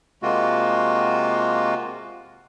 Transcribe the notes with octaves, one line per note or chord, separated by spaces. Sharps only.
C3 G#3 A#3 F4 F#4